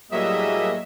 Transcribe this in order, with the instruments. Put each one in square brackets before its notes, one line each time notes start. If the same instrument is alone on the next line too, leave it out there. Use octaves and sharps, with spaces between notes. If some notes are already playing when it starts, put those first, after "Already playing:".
[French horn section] A2 G3 G#4 [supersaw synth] F#3 E5 [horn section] A#3 D#5